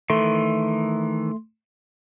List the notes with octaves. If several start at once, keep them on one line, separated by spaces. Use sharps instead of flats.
D#3 E3 A3 C6